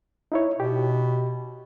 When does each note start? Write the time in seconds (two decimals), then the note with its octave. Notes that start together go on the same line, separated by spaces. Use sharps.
0.32 D#4 E4 C#5
0.60 B2 G4